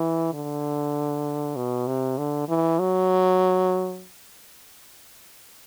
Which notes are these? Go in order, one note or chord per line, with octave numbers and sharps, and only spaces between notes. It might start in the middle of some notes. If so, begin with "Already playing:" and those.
Already playing: E3
D3
B2
C3
D3
E3
F#3